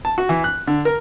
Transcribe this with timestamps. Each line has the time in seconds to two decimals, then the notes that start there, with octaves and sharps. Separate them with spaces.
0.05 A5
0.18 F#4
0.29 E3
0.44 F#6
0.67 D3
0.85 A#4